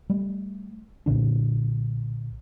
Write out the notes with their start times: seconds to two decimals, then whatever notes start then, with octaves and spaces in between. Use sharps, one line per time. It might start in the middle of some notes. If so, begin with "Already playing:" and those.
0.10 G3 A3
1.06 B1 A#2 D3 D4